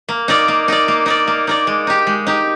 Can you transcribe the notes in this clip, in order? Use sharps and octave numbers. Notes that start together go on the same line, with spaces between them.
A#3
D#4 A#4 D5
A#3
D#4 A#4 D5
A#3
D#4 A#4 D5
A#3
D#4 A#4 D5
G#3
D#4 G4
G#3
D#4 G4